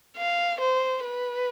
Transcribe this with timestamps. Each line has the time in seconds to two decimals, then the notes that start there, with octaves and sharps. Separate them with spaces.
0.17 F5
0.60 C5
1.03 B4